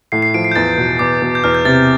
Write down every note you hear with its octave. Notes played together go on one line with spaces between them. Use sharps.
A2 C7
C7
F3 D7
C7
G6
E2 A6
B2
E2 D6
B2
G6
E2 F6
G6
C3 A6